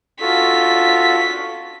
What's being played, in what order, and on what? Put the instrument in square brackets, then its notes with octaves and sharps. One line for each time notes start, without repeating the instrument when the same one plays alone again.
[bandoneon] F4 F#4 A4 [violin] B6